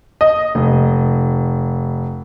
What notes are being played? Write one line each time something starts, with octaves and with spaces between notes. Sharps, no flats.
D#5
F1